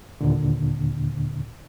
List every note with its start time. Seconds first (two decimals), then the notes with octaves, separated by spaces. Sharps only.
0.21 D#2 A#2 D3